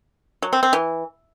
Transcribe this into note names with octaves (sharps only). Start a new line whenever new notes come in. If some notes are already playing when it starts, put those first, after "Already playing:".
F#3
C4
C4
E3